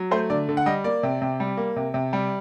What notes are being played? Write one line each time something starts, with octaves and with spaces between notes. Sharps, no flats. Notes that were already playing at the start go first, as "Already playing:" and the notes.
Already playing: F#3
A3 C5
D3 D5
D3
F#5
G3 D#5
A#3 D5
C3
C3
G3
A#3
C3
C3
G3